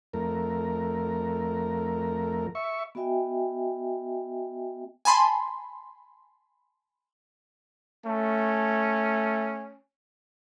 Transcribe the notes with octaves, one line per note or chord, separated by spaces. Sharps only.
F2 A3 A#4
E5 C#6
B3 F#4 D#5 E5 G5 G#5
G#5 A5 B5 C6
A3 C#4